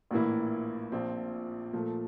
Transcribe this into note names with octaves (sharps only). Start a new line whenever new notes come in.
A#1 A2 E3 A#3 E4
A#1 A#2 F3 C4
A#2 F3 A3